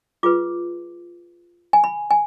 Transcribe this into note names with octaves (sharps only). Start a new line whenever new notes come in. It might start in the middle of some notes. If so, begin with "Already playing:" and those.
F4 G#4 B4 D6
G#5
B5
G#5